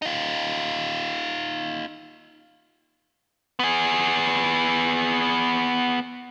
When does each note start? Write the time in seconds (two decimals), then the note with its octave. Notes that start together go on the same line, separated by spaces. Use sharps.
0.02 D#4 F4
3.59 B3 G#4